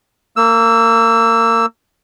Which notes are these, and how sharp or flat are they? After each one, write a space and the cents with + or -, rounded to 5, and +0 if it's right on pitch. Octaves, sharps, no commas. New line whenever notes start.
A#3 -30 E6 +10